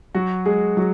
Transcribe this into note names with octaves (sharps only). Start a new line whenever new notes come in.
F#3 F#4
G#3 G#4
F#3 F#4